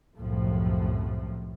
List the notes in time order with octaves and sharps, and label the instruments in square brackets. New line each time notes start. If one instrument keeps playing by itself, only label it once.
[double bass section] C2 F#2 A2 F3